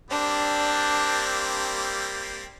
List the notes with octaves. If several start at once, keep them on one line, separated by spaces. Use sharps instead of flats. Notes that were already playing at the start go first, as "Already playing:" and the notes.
G3 A#3 C4 D4